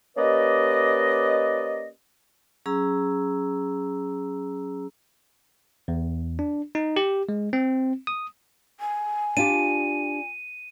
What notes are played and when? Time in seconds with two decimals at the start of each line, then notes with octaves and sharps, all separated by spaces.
0.17 A#3 C#4 G4 B4 D5 D#5
2.66 F#3 C#4 G#4 A#5 E6
5.88 E2
6.39 D4
6.75 D#4
6.96 G4
7.29 G#3
7.53 C4
8.07 D#6
8.80 G#5
9.37 D4 F4 G4 D#7